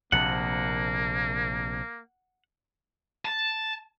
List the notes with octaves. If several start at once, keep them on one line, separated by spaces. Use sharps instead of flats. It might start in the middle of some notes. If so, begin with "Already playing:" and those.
A#1 C3 A#3 F#5
A5